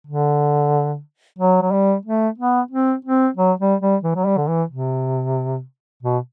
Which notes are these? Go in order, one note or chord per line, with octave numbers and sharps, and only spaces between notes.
D3
F#3
F#3
G3
A3
B3
C4
C4
F#3
G3
G3
E3
F#3
G3
D3
E3
C3
B2